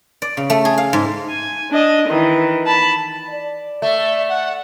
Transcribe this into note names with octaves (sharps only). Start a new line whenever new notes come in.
D5
C#3
A3
G#4
F5
G#2
G#5
D4 D#5
D#3 E3
A5 B5
D5
A3 E5
F#5